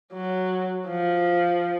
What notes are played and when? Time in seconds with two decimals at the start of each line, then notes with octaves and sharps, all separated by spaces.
0.14 F#3
0.87 F3